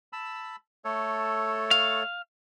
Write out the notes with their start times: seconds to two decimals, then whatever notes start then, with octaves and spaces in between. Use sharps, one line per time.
0.13 A5 B5 E6
0.85 A3 A4 C#5
1.71 F5